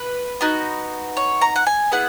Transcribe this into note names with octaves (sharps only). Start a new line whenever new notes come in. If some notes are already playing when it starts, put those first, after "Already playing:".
Already playing: B4
B3 D#4 F#4
C#5
A#5
F#5
G#5
B3 E4 G#4 F#5